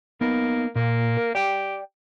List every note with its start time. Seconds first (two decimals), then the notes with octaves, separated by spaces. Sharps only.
0.21 A#3 B3 D#4
0.76 A#2 A#3
1.17 A#4
1.35 G4 D5 G5